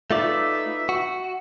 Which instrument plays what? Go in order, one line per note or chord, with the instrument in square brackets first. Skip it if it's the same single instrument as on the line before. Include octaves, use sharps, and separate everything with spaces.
[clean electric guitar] A3 F4 D5 [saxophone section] D#4 B4 E5
[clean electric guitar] F#4